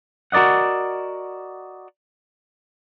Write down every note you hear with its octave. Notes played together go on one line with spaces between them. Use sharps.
F#4 A#4 D5 D#5 F#5